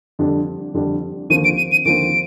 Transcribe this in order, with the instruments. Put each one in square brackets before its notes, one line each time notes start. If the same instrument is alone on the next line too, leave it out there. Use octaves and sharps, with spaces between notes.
[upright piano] F2 D3 G3 D4
F2 D3 G3 D4
[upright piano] D#2 D3 F3 C4 [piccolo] D#7
[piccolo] D7
D#7
D#7
[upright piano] D#2 D3 F3 C4 [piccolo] D7